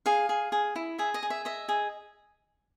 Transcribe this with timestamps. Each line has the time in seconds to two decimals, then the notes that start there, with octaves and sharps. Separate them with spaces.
0.06 G#4 F5
0.29 G#4
0.52 G#4
0.76 E4
0.98 G#4 E5
1.14 D#5
1.23 G#4
1.30 E5
1.45 D#5 E5
1.69 G#4